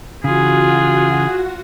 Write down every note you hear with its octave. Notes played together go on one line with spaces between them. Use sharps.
C#3 E3 F4 F#4 G#4 F#5